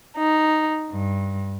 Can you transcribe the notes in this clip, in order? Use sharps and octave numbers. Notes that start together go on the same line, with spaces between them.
D#4
G2